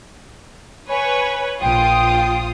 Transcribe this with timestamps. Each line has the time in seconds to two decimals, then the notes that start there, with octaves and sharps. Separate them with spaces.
0.90 B4 C#5 G#5
1.61 A#1 F4 G5 D#6